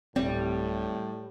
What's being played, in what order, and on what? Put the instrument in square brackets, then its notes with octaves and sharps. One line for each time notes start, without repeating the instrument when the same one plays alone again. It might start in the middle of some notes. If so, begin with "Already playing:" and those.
[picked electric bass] D1 G1 C4 [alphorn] A2 [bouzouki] G3